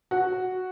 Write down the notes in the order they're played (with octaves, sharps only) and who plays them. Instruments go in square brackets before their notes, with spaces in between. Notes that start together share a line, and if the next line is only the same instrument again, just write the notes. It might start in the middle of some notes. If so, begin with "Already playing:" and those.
[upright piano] F#4